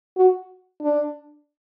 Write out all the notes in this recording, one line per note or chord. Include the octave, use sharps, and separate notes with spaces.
F#4
D4